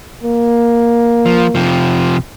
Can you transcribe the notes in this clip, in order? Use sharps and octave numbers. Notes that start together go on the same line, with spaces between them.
A#3
F3
C3 F3